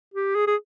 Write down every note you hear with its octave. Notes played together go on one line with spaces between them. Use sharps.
G4
G#4
G#4